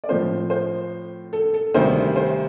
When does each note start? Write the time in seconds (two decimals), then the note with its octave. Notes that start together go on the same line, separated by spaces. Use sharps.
0.04 D5
0.08 A2 F3 C4 C5
0.50 C5
1.33 A4
1.54 A4
1.74 D2 C3 D#3 G3 C5
2.16 C5